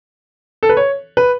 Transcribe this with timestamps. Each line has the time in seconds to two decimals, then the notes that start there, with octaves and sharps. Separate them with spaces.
0.63 A4
0.69 B4
0.77 C#5
1.17 B4